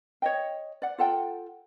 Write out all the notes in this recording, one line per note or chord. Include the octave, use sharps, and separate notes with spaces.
C#5 D#5 G5
D5 F#5
F4 A4 F#5 G5